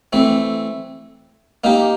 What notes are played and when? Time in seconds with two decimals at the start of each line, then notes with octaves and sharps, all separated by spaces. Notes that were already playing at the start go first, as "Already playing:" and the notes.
0.13 E3 A3 C4
1.64 A#3 D#4 G4